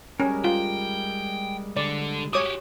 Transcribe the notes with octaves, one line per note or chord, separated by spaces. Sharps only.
G3 G#3 C#4 A#4
F4 G5
D3 D5
F#4 G4 C#5 D6 D#6